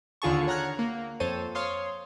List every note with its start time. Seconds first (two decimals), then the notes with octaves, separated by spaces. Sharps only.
0.22 D#2 D3 F4 G#4 A5 C#6
0.47 C#5 F#5 A#5 F6 F#6 G#6
0.79 A#3
1.20 F2 A4 C5 C#5 A6 D#7
1.55 C#5 F5 C6 D#6